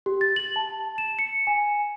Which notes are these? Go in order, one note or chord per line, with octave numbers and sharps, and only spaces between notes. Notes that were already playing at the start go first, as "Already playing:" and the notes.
G4
A6
F#7
A5
E7
C#7
G#5